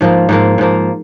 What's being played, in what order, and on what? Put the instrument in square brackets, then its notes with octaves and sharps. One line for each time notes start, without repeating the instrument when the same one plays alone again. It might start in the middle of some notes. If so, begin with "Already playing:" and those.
[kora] G#2 F3 A#3
G#2 F3 A#3
G#2 F3 A#3